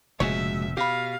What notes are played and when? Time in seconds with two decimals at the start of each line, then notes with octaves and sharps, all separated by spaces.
0.20 F1 A#2 C#3 G#3 F#4 C#5 E5
0.77 B2 G4 F5 B5